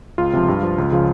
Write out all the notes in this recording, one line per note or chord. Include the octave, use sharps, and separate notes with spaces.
C#2 F4
C3 F3
G2
F3
C#2
C#3 F3